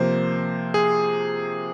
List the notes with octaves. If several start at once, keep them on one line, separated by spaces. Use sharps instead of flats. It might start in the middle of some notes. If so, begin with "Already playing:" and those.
Already playing: C3 F3 A#3 C5
G#4